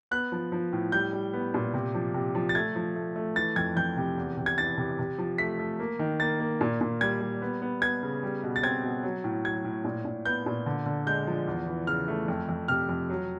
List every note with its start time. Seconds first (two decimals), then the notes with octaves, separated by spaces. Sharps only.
0.11 B3 F#6
0.32 F3
0.52 F3
0.73 A2
0.92 G3 G6
1.13 G3
1.33 B3
1.54 A#2
1.74 C3
1.94 F3
2.14 C3
2.35 F3
2.49 A6
2.55 A3 G#6
2.75 F3
2.96 A3
3.16 A3
3.36 E3 A6
3.56 F2 G#6
3.76 F2 G6
3.97 C3
4.18 E2
4.37 C3
4.46 G#6
4.58 E3 A6
4.78 C3
4.99 C3
5.18 F3
5.38 A3 B6
5.59 A3
5.79 A#3
5.99 D#3
6.20 A#3 A6
6.40 A#3
6.61 A#2
6.81 A#2
7.01 G3 G#6
7.21 G3
7.42 B3
7.62 B3
7.82 B3 G#6
8.03 C#3
8.23 G3
8.43 B2
8.56 A6
8.63 C4 G#6
8.83 B2
9.03 F#3
9.24 A2
9.45 F#3 G#6
9.64 A2
9.84 A#2
10.05 A#2
10.25 B3 G6
10.46 A#2
10.66 D3
10.86 D3
11.06 G#3 G6
11.27 F3
11.47 E2
11.67 E3
11.87 C#3 F6
12.08 A3
12.28 F2
12.49 F2
12.68 C3 F6
12.89 F2
13.10 F#3